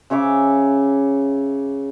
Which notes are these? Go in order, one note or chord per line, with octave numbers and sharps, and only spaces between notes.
C#3 C#5 E5 D6